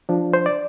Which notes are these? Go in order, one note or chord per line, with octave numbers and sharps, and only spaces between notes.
F3 D4
C5
D5